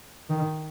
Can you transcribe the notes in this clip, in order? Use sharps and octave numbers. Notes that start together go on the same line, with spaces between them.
D#3